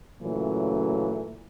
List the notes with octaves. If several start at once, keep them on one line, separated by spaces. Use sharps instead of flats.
A#2 C#3 E3 F#3 A3